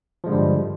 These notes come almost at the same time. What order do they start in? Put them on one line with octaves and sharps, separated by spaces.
F3 G#3 D3 G3 G2